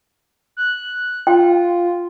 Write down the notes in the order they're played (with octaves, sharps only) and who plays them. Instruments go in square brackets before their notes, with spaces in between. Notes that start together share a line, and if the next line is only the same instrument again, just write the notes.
[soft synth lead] F#6
[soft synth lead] F4 [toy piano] G5